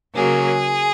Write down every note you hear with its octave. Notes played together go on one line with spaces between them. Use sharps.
C#3 F#3 A#3 G#4